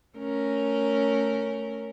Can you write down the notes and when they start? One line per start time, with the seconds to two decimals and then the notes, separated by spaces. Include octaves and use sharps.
0.18 A3 C#4 A#4